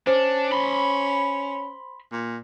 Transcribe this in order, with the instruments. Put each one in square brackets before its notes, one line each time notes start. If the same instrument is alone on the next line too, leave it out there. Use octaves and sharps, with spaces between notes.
[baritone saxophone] C#4 [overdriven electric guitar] D4 [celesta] C5
[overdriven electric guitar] B5 C6
[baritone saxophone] A#2